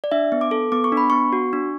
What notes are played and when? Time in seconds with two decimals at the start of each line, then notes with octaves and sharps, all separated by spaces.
0.04 D5
0.12 D4 E5
0.32 B3
0.41 D6
0.51 A4
0.72 B3 D6
0.84 C#6
0.92 D4
0.97 B5
1.10 B3 C#6
1.33 F#4
1.53 D4